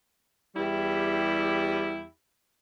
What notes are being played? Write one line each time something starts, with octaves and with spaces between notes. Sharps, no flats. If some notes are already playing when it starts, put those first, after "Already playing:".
E2 G3 E4 G4